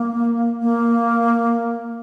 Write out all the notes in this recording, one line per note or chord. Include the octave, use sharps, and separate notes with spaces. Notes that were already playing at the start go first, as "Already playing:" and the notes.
Already playing: A#3
A#3